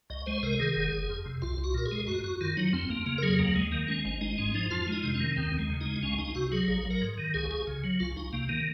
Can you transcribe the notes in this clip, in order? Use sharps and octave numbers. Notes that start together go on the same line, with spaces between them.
C#2 D#5
G#3 C5
C3 A#4
D#3 G#4
F#1
F#1
F2
C3
C2 F4
C2
F#4
A#2 A#4
G#4
G#3
F#2 F#4
F#2 F#4
D#3 F4
F#3 D#4
F2 C4
F2 A#3
C#3 A#3
A#4
F#3 G#4
D#2 A#3
D#2 G#3
D#3 A#3
G#3 C#4
G#1 C#4
G#3 D#4
G#2 C#4
F3 D#4
F2 F4
G#3 D#4
C3
C#4
D#3
D#2 C4
D#2
G#3
C#3
G#3 D#4
C#2 C#4
C#2 D#4
C3 F#4
F#3 G#4
A#1 G#4
F#3
A#4
G#2
D#3
C#2 G#4
C#2 G#4
C#3
F#3
C#2 F4
C#2 D#4
C3 A#3
D#3 A#3